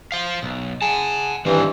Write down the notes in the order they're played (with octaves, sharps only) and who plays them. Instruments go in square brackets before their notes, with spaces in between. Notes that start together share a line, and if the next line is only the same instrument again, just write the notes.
[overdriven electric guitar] C5 F5
B1
[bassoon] G#4 [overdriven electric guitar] F#5 A5
[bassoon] G2 [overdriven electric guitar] D#3 C4 [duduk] E3